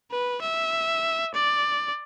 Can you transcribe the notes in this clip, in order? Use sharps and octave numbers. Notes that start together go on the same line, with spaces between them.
B4
E5
D5